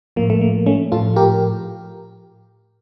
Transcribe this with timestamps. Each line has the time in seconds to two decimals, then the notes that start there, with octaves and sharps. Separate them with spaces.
0.16 A2 F3 A#3
0.30 A3
0.41 A#3
0.66 A3 C#4
0.92 A2 F3 F4 A4
1.16 G4 A#4